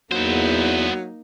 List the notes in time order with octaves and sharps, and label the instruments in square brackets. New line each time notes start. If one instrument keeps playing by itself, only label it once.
[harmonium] E2 [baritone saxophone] F#3 [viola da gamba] A#3 D#4 [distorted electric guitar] B3 C5